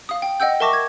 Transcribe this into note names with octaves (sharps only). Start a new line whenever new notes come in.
F5 D#6
G5
D#5 F#5 G5 E6 G6
A#4 E5 A5 C#6 D6 A#6
G#6